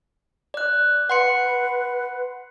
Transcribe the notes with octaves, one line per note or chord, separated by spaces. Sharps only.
D5 F#6
B4 F#5 C6 C#7